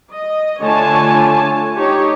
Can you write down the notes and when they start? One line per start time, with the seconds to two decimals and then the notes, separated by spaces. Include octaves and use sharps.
0.11 D#5
0.60 D3 A3 F4 C#5 G#5 A5
1.77 D#4 G4 C#5